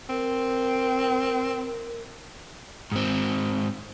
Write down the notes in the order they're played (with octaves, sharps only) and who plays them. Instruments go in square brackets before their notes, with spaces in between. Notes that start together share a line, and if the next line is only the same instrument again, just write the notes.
[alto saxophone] C4 [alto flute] A#4
[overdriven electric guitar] G#2 C4